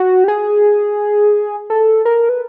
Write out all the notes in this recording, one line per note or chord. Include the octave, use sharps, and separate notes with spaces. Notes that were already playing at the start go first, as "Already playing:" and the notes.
Already playing: F#4
G4
G#4
A4
A#4
B4